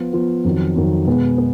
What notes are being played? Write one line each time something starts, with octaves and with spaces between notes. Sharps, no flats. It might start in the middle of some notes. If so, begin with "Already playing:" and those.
Already playing: F3 B3 F4
F3 B3 F4
F2 D#3 F#3
F2 D#3 F#3
B2 G#3 B3
B3